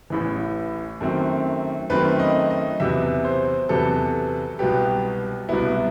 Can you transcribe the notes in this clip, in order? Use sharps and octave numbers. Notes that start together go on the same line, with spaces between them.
A1 A2 E3
F#2 D#3 F#3 A3 C4
F#2 D#3 F#3 A3 C4 B4
D#5
D#5
E2 C3 F#3 B3 E5
C5
E2 C3 F#3 B3 A4
C2 B2 F#3 B3 G4
C2 B2 F#3 B3 E4